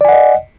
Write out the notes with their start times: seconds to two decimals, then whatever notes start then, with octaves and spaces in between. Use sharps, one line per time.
0.01 D5
0.05 G#5
0.09 F#5
0.12 D#5